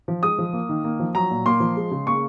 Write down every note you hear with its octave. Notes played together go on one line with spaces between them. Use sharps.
F3
G#3 D#6
F3
A#3
D#3
A#3
F3
F#3 A#5
A#2
A#3 C6
F3
G#3
C#3
A#3 C#6